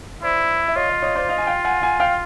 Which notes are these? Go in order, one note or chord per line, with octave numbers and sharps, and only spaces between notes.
E4 C5 D5
E5
F4 C#5 D#5
D#5 F5
C#5 D#5
C5 D5
D#5 F5
G#5
F5 G5
F#5 G#5
F#5 G#5
F5 G5